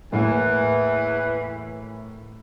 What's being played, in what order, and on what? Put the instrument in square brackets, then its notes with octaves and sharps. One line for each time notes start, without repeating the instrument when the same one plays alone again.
[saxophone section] E2 E3 [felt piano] A2 A#3